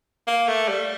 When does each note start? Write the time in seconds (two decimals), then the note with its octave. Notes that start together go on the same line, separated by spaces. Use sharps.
0.27 A#3
0.48 A3
0.68 G3